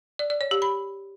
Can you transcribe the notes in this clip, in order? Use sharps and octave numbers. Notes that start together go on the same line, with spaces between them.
D5
D5
C#5
G4
B5